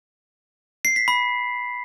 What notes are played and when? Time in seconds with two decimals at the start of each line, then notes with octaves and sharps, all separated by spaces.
0.85 C7
0.96 B6
1.08 B5